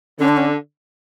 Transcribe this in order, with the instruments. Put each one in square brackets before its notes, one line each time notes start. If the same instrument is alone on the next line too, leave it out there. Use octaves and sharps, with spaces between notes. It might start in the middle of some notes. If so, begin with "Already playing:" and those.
[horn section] D3 [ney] C#4
[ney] D4
C#4